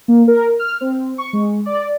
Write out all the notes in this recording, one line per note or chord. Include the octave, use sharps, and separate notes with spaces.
A#3
A#4
F6
C4
C#6
G#3
D5